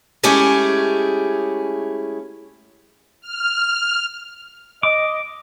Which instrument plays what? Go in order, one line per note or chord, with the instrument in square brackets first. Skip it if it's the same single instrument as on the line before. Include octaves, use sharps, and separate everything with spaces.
[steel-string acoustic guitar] G#3 A3 C#4 E4 G4 G#4
[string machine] F6
[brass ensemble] D#5 [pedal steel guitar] D6